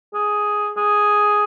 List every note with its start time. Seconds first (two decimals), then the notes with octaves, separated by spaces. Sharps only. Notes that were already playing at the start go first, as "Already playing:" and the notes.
0.14 G#4
0.77 G#4